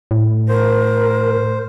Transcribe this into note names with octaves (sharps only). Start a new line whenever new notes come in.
A2
A#4 C5